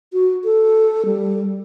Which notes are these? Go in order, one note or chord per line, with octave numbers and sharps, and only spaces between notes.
F#4
A4
G3